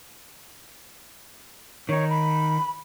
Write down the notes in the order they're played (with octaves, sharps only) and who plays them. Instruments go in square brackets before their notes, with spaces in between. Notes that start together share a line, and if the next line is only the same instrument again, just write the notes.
[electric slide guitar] D#3 D#4 [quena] C#5
[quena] B5